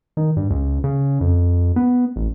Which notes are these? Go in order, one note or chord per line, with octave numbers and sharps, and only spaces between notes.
D#3
G2
C#2
C#3
F2
B3
A1